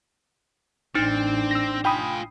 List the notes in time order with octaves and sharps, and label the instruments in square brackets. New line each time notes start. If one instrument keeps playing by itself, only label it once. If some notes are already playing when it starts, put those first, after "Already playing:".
[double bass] A1 D4 [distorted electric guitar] C4 [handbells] D#4
[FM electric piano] E6 A#6
[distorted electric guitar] F4 G#5 [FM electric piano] G5 B5 D#6